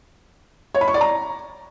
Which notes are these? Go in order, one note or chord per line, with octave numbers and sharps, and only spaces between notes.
C#5
B5
C#6
D5
A#5